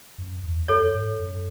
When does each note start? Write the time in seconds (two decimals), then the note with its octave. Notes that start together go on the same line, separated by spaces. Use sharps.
0.18 F#2
0.43 E2
0.68 F#2 A4 C#5
0.94 G#2
1.20 F#2